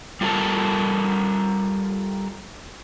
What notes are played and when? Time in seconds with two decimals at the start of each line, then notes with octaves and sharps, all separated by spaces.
0.21 G3 F4 A4 A#4 A5